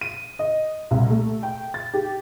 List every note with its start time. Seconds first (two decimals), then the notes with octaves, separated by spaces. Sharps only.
0.01 D#7
0.39 D#5
0.91 C2
1.10 A3
1.43 G5
1.74 A6
1.94 G4